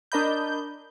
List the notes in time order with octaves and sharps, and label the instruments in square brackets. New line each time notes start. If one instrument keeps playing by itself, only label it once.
[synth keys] D4 A#4 D#5 B5 G6